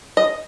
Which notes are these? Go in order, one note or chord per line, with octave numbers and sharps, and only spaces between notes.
D#5